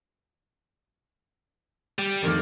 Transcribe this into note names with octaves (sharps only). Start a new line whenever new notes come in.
G3
F2 D#3 A#3